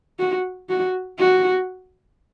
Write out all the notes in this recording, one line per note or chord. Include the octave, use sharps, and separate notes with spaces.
F#4
F#4
F#4